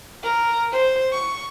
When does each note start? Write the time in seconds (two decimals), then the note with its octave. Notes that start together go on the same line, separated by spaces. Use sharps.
0.23 A#4
0.72 C5
1.12 C#6